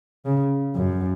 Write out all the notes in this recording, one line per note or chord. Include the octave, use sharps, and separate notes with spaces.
C#3
F#2